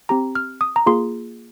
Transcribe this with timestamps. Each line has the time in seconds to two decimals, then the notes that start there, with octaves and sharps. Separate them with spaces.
0.09 C4 G4 A#5
0.35 F6
0.61 D#6
0.76 A#5
0.86 A#3 F4 G#4 C6